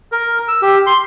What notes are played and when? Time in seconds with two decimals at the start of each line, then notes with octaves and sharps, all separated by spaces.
0.12 A#4
0.48 E6
0.62 G4
0.86 C6